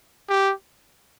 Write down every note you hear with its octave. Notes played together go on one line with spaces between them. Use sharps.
G4